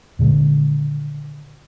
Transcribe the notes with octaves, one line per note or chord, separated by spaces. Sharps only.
A#2 D3 D#3 G#3